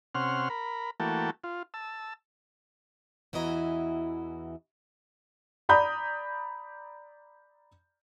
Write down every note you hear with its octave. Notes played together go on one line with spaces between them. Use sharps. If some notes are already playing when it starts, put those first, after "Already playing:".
C3 C#4 F#5 C6 F6
A#4 B5
E3 A3 A#3 F#4 G5 A5
F4
A5 E6
E2 E3 E4 F#4 D#5 A#5
D5 A#5 B5 D#6 G6